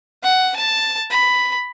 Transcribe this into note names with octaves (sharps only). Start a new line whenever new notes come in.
F#5
A5
B5